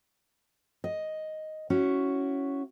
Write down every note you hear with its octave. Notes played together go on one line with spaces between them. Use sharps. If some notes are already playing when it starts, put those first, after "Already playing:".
D#5
C#4 E4 F#4